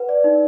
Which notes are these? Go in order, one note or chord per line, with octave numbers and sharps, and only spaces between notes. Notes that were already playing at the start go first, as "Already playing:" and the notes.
Already playing: B4 F#5
D5
D#4